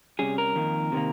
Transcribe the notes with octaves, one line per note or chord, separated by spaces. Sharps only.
C3 G3 C#4 G#4
A#4
F2 D#3 A#3
C3 D#3 A#3